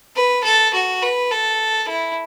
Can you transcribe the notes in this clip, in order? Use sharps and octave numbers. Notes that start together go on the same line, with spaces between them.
B4
A4
F#4
B4
A4
E4